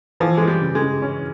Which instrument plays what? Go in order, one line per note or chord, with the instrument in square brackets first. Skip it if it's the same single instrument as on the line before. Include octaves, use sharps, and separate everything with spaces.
[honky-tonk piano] E3 [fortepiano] F3
[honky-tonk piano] E3 [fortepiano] G#3
[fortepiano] G3
[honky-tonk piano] C#3
[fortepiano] G#3
[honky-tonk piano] C#3
C#4